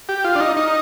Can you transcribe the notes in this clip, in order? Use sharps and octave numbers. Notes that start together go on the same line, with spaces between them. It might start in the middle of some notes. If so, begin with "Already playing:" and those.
G4
F4
D4
D#4
D#4